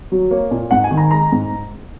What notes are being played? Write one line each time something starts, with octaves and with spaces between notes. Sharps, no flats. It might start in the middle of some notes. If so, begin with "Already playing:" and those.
F#3
A#3 C#5
A#2
G#2 F#5
G#5
D#3
A#5
G#3 A#5
G#2